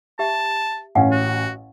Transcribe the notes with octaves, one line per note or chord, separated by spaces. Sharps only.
G4 E5 A5
A1 C#4 F5 F#5 G#5
F#4